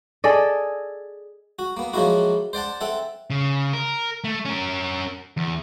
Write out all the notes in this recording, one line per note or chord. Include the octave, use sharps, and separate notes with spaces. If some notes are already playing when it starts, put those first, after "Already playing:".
G#4 A4 D5 D#5
F#4
A#3 B3
F3 F#3 G#3 A#3 E4 F#4
C5 D5 F#5 A5
C4 A4 E5 F#5
C#3
A#4
A3
C#4 A#4
E2